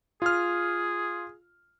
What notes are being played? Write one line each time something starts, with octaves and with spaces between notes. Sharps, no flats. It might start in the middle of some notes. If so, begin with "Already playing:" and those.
F4 G#4 F6